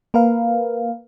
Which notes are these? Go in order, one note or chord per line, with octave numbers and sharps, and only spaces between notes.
A#3 A#4 B4 F5